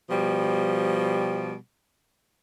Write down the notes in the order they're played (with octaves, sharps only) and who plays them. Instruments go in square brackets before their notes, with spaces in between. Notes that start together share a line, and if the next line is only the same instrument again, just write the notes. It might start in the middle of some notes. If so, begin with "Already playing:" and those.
[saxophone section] B2 F3 G3